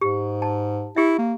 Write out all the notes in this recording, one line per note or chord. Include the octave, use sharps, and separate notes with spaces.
G#2 G4
A5
E4 G4 E5
A#3